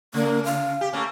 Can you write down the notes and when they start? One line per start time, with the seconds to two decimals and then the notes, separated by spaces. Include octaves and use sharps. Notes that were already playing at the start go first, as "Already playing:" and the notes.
0.14 C#3 A#3
0.45 F5
0.81 G4
0.92 A3 A#3 C#4